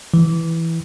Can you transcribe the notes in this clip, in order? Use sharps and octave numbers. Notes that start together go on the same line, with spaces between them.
E3